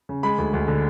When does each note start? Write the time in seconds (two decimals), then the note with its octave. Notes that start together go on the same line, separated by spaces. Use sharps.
0.09 C#3
0.23 G#3 B5
0.38 D2
0.53 D2
0.68 D3